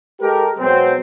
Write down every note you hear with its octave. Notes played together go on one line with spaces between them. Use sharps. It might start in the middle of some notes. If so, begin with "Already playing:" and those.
G#3 G4 A4 A#4
B2 F#3 G#3 B3 C4